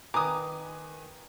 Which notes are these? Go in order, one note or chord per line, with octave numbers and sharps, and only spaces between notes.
D#3 B4 G#5 A#5 D6 D#6